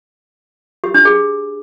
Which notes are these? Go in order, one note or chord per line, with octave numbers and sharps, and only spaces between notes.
G4
D4
G#4